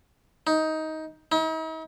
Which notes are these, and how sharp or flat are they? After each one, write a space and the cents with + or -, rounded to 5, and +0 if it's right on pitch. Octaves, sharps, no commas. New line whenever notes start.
D#4 +15
D#4 +45